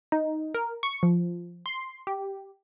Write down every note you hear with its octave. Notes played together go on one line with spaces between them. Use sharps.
D#4
A#4
C#6
F3
C6
G4